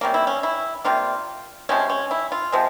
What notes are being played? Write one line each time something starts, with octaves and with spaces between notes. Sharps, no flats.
C3 G3 A#3 C#4
E4
C#4
E4
C3 G3 A#3 F4
C3 F3 G#3 C#4
C#4
E4
F4
C3 F3 G#3